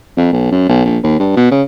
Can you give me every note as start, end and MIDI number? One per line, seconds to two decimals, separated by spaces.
0.17 0.32 41
0.33 0.47 35
0.52 0.67 42
0.69 0.84 35
0.85 0.98 34
1.04 1.19 39
1.20 1.35 43
1.37 1.49 47
1.52 1.63 49